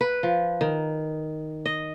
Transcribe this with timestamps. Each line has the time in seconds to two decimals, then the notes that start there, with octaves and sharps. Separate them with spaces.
0.01 B4
0.23 F3
0.61 D#3
1.66 D#5